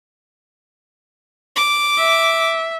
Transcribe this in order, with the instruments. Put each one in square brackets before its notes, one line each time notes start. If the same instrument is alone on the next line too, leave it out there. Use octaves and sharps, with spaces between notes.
[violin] D6
[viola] E5